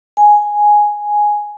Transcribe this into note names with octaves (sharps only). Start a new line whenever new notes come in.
G#5